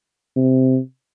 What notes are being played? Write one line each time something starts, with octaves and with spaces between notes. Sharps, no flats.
C3